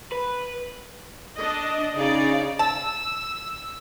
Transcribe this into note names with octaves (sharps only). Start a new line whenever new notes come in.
B4
D4 D#5
C#3 D#4 G#4 D5
A5 E6